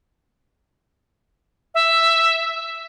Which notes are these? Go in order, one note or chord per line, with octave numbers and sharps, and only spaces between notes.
E5